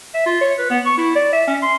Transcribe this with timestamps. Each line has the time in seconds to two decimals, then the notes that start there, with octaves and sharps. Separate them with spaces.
0.14 E5
0.26 F4
0.41 C#5
0.59 B4
0.71 B3
0.86 C#6
0.98 E4
1.15 D5
1.33 E5
1.47 C#4
1.62 C6